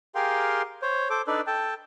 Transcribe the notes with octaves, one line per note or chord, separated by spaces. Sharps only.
G4 G#4 A#4 F5 G5 C6
C5 C#5
A4 C5 D6
D4 D#4 A4 B4 D5
A4 G5 A5